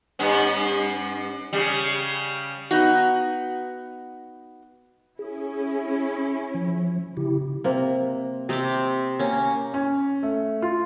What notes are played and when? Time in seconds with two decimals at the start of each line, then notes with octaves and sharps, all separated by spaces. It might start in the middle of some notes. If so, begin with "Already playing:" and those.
0.19 G2 B3 C#4
1.53 C#3 G3
2.71 B3 D#4 F#4
5.19 C#4 E4 G#4
6.54 F3
7.17 C#3 E4 G4
7.64 C3 A#3
8.49 C3 D#5 E5 G5 D6
9.20 A#3 C#4
9.74 C#4
10.23 A3
10.62 F4